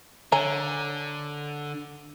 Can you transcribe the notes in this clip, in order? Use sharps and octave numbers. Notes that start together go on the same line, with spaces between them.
D3 C#5 G#5 A#5